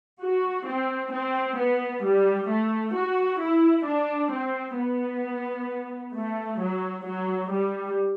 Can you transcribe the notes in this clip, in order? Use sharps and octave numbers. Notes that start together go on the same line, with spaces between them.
F#4
C4
C4
B3
G3
A3
F#4
E4
D4
C4
B3
A3
F#3
F#3
G3